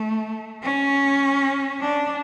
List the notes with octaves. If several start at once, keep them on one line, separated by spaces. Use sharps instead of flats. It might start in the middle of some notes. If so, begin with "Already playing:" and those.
Already playing: A3
C#4
D4